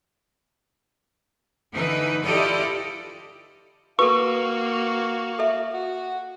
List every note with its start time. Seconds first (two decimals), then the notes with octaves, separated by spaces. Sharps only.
1.73 D3 E3 D#4 B4
2.25 E4 F4 G4 A4 D5 D#5
3.99 A#3 F#4 A4 B4 F5 C#6
5.39 A4 E5
5.73 F#4